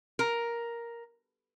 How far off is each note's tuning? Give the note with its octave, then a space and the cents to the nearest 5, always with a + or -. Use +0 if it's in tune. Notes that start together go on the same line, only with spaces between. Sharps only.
A#4 +5